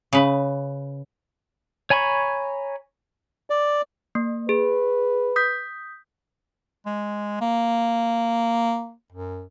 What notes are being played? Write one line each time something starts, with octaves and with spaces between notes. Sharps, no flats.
C#3 B4
C#5 G#5 A#5 B5 C#6
D5
A#3
G#4 B4
D#6 G6 B6
G#3
A#3
F#2